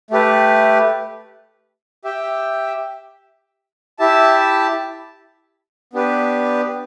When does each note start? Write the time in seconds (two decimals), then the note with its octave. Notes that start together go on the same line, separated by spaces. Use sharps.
0.10 A3 G4 B4
2.05 G4 E5 G5
3.99 E4 G4 E5 A5
5.93 B3 D4 G4 B4